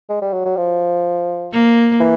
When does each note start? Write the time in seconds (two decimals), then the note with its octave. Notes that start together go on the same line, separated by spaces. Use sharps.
0.09 G#3
0.22 G3
0.33 F#3
0.45 F#3
0.57 F3
1.52 A#3
2.00 E3